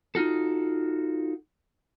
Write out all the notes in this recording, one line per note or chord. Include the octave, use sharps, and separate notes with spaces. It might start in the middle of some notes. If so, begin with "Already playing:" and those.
D#4 F4 F#4 A4